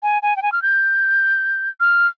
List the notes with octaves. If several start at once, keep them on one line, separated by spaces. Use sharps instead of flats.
G#5
G#5
G5
G#5
F6
G6
F6